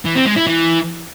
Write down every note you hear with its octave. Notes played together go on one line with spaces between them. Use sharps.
E3
C4
G#3
E4
E3